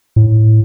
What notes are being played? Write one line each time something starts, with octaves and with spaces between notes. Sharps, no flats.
A2